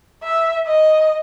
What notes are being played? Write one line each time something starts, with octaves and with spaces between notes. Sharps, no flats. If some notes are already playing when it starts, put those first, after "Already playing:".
E5
D#5